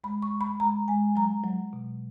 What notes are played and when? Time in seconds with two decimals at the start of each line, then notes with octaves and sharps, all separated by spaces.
0.04 G#3 B5
0.22 C#6
0.32 G#3
0.41 B5
0.60 G#3 A#5
0.88 G#3 G#5
1.16 F#3 A#5
1.44 F#3
1.73 B2